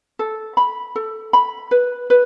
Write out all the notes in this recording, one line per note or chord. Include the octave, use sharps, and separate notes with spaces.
A4
B5
A4
B5
B4
B4